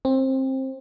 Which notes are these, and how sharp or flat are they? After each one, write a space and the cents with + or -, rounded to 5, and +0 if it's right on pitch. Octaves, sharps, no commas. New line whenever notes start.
C4 +20